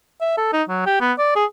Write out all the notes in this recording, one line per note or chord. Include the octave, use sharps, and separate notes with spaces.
E5
A4
D#4
F#3
G4
B3
D5
G#4